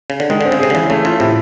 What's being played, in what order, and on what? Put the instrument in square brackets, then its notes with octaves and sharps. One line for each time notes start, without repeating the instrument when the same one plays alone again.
[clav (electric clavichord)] C#3
D3
[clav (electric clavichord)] D#3 [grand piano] G#3
[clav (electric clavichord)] D3 [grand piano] C4
[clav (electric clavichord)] C#3
[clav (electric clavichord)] C3 [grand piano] G#4
[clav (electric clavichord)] D3
[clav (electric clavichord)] C#3 [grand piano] E3
[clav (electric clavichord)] C#3 [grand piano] A3
[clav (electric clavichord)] C#3 [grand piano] F4
[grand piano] A2 [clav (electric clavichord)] C3